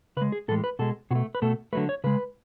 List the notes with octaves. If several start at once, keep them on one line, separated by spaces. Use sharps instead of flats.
C#3 G#3 B4
G#4
A2 E3 G#3 A4
B4
B2 G#3 A4
B2 A3 F#4
B4
B2 A3 A4
D3 F#3 A3 B4
C#5
C#3 G#3 B4